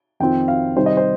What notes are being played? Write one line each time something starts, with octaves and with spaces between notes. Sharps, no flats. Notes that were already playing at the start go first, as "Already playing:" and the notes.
F2 D#3 C4 F4 G5
F5
C3 D#3 G3 D#4 C5
D#5
C5